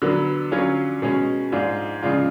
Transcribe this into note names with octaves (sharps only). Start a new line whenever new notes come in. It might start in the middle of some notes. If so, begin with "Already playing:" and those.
D3 F#3 B3
D3 F#3 C#4 F4
B2 G#3 C#4
G#2 G#3 D4 F4
C#3 F3 G#3 D4 F4